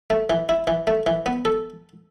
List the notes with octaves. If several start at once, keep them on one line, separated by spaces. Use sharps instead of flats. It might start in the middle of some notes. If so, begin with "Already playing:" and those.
A3
E3
E4
E3
A3
E3
B3
A4